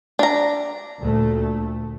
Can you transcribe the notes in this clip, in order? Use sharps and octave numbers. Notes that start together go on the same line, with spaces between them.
D4 A#5
D2 A#2 A3